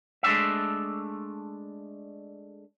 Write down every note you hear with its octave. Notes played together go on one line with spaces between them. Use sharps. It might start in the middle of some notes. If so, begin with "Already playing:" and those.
G#3 A3 D4 E5